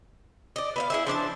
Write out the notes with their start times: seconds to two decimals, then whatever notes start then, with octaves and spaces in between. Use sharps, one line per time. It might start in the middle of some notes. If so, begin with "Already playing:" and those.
0.56 D5 D#5
0.76 B3 E5 F5
0.90 E4 G#4 E5
1.07 F3 D4 D5 A5